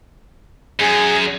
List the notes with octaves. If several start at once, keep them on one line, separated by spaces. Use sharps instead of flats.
F#2 G#4